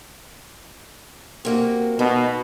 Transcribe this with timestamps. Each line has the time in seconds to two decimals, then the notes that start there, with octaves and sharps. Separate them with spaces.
1.45 C3 A#3 F#4
1.99 B2 B3 D#4